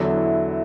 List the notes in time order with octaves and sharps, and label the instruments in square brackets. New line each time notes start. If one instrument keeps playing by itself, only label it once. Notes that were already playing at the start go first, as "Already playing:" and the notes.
Already playing: [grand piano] E2 D3 F#3 [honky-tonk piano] E4